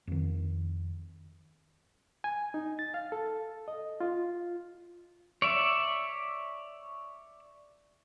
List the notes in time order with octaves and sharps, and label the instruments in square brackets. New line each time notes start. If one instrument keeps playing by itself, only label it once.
[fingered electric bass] F2 D#3
[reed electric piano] G#5
D#4
A6
F5
A4
D#5
F4
[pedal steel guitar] C#5 D5 E5